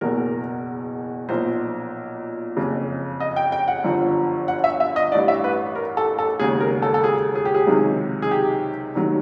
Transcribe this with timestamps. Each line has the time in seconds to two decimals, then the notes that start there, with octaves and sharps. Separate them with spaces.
0.01 F#1 E2 B2 A#4
1.29 B1 A#2 F3 C5
2.57 F#1 F2 C#3
3.20 D#5
3.36 G5
3.52 G5
3.68 F#5
3.84 G1 F#2 D3 F3
4.48 F#5
4.64 E5
4.80 E5
4.96 D#5
5.12 A1 G2 E3 D5
5.28 E5
5.44 B4
5.75 A#4
5.97 A4
6.19 A4
6.40 E1 D#2 C#3 G#4
6.61 A#4
6.82 A4
6.94 A4
7.04 G#4
7.35 G#4
7.45 G4
7.54 G#4
7.67 C#2 C3 D#3 F#3
8.22 G#4
8.31 G4
8.95 F1 D#2 D#3 F#3